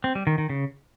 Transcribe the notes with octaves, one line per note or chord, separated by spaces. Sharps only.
C4
G3
D#3
D#3
C#3